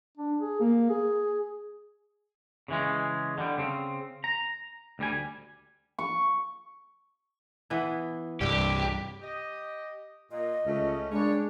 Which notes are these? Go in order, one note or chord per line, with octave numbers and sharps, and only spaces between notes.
D4
G#4
A#3
G#4
C#3 E3 G#3
D3 G3
C#3 C4
A#5
D2 G3 G#5
C#6
E3 B3 E4
C2 G2 G3 C4 G4
G4 D#5
A#2 D#5
C#2 A3 C#4
G2 A#2 G#3 D4 C#5